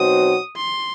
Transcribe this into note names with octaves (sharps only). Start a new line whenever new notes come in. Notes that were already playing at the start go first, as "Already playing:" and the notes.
Already playing: B2 F#3 C4 D#4 F#4 D#6
C6